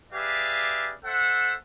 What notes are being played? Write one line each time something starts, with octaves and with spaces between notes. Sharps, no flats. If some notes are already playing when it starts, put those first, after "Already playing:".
G4 G#4 B4 D5 E5 F5
A4 C5 E5 F#5